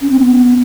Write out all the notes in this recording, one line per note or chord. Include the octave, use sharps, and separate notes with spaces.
C#4
C4
B3